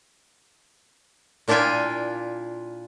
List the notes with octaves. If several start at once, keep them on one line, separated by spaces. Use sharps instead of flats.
A#2 D4 E4 F4 G5 G#5